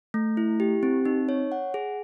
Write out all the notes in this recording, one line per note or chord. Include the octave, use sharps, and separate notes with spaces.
A3
E4
G4
C4
D#4
C#5
F#5
G#4